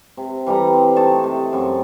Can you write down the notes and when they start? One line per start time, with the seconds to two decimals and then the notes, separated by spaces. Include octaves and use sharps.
0.17 C3
0.46 E3 G3 A4 A#5
0.73 C4
0.96 A3 D#4 A5 C#6
1.24 C3
1.53 F#2 C4 C#6